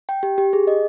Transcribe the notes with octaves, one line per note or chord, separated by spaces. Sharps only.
G5
G4
G4
G#4
D#5